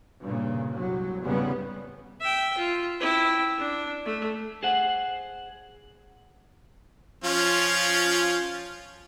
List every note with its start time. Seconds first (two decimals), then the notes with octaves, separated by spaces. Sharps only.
0.22 G2 A#2 C#3
0.73 C2 F#3
1.22 F1 E2 G#2 C#3 G3 B3
2.20 E5 G5
2.58 F4
3.00 E4 G5
3.58 D4
4.05 A3
4.63 G#4 C5 F#5
7.24 F3 C#4 F4